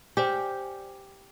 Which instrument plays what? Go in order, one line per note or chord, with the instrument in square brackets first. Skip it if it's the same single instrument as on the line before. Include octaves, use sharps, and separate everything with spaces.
[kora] G4 [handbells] C5 D5 G#5